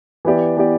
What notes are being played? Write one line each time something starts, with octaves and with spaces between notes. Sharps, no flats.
E3 B3 E4 G4 D5
E3 B3 E4 G4 D5